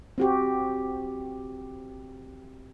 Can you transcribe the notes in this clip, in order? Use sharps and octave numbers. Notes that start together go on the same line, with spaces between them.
C4 F#4 G4